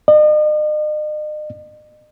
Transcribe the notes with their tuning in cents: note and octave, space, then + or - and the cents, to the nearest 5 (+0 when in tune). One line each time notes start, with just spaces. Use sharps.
D#5 -40